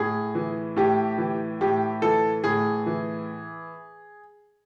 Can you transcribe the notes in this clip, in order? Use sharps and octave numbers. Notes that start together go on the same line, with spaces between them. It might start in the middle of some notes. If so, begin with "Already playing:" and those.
Already playing: A2 G#4
E3
A2 G4
E3
A2 G4
E3 A4
A2 G#4
E3